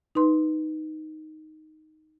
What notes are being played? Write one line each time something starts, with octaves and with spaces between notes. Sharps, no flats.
D#4 B4 C6